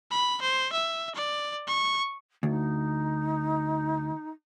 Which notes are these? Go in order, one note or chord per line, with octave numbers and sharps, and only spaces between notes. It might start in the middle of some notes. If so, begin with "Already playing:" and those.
B5
C5
E5
D5
C#6
D2 D#4